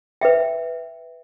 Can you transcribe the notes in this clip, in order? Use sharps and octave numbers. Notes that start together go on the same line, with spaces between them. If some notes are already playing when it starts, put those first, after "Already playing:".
B4 E5 G5